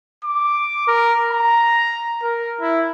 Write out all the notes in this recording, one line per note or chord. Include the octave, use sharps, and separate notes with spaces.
D6
A#4
A#5
A#4
E4